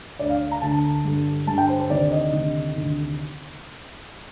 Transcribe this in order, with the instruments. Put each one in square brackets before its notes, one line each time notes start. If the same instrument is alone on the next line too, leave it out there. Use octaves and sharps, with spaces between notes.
[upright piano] D2 D3 D5
F5
A#5
D2 D3 A5
G2 D3
G2 A5
D3
G5
C5
C5
D2 C3 D#3 D5
D#5
D2 C3 D#3
D2 C3 D#3